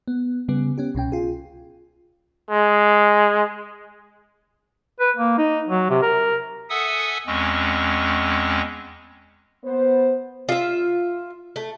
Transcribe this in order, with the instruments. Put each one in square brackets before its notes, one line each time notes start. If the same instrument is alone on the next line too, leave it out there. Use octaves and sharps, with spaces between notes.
[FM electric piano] B3
C#3 G3 B3
B3 C#4 G4
C2 B2 C#4 G5
F4 G#4
[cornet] G#3
[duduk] B4
A#3
D#4
F#3
C3
A#4
[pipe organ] A4 E5 F#5 G#5 D#6 E6
E2 G#3 C4 C#4 C#6
[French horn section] B3 C5
[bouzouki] F4 E5
A3